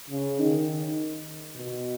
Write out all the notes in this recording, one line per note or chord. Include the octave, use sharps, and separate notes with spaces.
C#3
D#3
B2